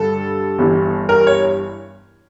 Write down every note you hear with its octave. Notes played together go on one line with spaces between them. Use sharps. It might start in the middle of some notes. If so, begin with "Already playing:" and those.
Already playing: G2 D3 G3 A4
G1 G2 E3
A#4
C#5